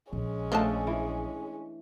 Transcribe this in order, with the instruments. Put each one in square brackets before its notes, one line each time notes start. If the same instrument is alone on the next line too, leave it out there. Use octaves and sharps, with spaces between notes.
[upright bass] A#1 [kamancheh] G#3 C#4
[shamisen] F3 A5 [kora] A3 D4 D#5
[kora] E3